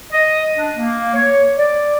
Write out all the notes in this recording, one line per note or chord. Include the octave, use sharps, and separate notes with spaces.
D#5
D4
A#3
C#5
D5